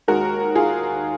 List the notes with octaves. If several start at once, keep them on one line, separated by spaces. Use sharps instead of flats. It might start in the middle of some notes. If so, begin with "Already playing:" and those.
D#2 D#3 G#3 F#4 A#4
F4 G#4